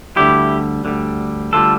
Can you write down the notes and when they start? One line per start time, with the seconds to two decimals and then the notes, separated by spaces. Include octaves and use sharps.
0.16 D2 D3 G3 E4 G4
0.85 D2 D3 G3
1.53 D2 D3 G3 F4 A4